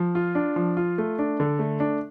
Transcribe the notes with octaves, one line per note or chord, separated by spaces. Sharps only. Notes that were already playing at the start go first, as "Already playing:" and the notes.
Already playing: F3
F4
D4
F3
F4
A3
D4
D3
A3
D4